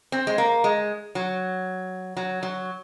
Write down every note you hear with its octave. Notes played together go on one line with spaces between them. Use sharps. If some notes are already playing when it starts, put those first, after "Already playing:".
C4
G#3
A#3
G#3
F#3
F#3
F#3